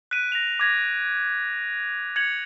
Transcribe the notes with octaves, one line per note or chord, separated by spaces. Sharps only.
F#6 B6 D7 D#7
A#6 D#7 F7
D6 G#6 A#6 B6
G#6 C#7 F7 F#7